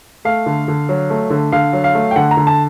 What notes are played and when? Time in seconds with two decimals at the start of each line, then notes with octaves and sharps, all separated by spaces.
0.25 A3 F5
0.46 D3
0.68 D3
0.89 F#3
1.10 A3
1.30 D3
1.52 D3 F5
1.73 F#3
1.84 F5
1.95 A3
2.11 G5
2.16 D3 F#5
2.31 A#5
2.37 D3
2.47 A5